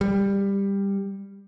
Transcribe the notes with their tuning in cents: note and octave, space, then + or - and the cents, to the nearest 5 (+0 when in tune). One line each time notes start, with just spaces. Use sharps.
G3 +15